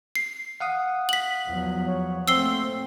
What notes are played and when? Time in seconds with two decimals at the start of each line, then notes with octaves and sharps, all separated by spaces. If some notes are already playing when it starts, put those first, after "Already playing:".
0.15 C7
0.60 F5 F#5 D#6
1.09 B6 F#7
1.45 E2 F3 F#3
1.86 C#5
2.28 A#2 A3 C4 E6 C7 G7